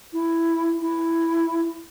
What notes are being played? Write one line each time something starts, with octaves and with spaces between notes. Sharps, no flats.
E4
E4